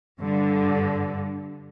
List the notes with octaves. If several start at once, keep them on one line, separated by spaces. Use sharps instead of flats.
G2 D3